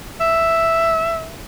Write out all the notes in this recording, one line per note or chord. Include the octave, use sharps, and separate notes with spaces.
E5